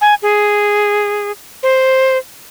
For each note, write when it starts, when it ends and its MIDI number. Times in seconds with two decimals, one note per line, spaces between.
0.01 0.14 80
0.22 1.32 68
1.63 2.17 72